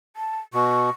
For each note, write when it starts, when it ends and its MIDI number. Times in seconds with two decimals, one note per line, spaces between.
0.16 0.40 81
0.54 0.90 47
0.54 0.91 85